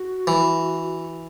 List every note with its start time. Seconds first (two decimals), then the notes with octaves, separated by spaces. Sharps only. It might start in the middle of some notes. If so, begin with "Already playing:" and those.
Already playing: F#4
0.27 E3